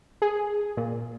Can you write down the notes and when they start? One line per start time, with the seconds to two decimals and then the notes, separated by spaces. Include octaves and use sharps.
0.22 G#4
0.77 A#2